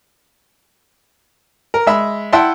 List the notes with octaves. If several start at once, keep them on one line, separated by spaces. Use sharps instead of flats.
A#4
G#3 E5 B5
E4 E5 F#5 G5 A5 C6